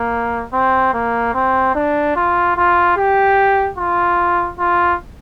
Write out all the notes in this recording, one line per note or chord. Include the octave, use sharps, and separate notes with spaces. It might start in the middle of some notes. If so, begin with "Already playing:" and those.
Already playing: A#3
C4
A#3
C4
D4
F4
F4
G4
F4
F4